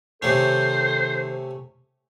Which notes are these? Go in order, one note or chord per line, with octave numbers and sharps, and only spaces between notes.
C3 D#3 A3 C#4 A4 C5